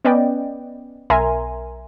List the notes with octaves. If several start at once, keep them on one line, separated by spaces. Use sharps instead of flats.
B3 C#4 B4 D5 D#5 G5
B1 A#4 E5 G#5 A#5 C6